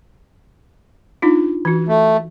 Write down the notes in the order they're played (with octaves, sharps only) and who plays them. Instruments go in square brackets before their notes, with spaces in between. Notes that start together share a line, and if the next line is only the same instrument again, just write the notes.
[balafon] D4 D#4 F4
E3 F#4
[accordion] A3